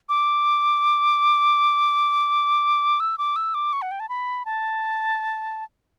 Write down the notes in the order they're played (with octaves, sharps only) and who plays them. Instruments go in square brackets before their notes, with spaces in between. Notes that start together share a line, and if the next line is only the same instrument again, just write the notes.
[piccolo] D6
E6
D6
E6
D6
C#6
F#5
G5
A5
B5
A5